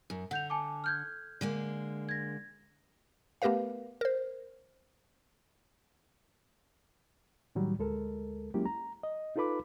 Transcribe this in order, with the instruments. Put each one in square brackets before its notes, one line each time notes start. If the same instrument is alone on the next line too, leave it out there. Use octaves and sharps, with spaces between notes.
[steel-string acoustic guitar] F#2
[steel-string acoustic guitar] D3 [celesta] F#5 G6 F7
[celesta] G#5 A5 D6
F6 G6 G#6
[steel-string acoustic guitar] D3 G#3 A#3
[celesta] G#6 A#6
[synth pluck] A3 B3 G4 A#4 B4 F5
A#4 C5
[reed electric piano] A2 D#3 F#3 G3
D2 G#3 A4 A#4
F#3 G#3 A#3 C#4 E4 G4
A#5
D#5
D#4 F4 A4 B4 B5 D6